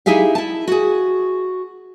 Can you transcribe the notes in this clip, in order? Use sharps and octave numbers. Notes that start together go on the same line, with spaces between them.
D#4 E4 G4 G#4 E5 F5
E4 A5
F#4 G#4